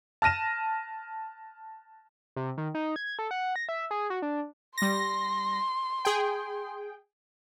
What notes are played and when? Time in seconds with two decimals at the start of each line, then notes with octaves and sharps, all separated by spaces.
0.22 A5 F6 A#6 D#7 E7
2.36 C3
2.58 D#3
2.75 D#4
2.96 G#6
3.19 A4
3.31 F#5
3.56 A#6
3.69 E5
3.91 G#4
4.10 F#4
4.22 D4
4.78 G3 C6 A#6
6.05 G#4 G5